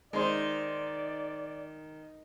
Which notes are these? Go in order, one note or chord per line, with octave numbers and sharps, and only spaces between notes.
D#3 G#3 C5 D5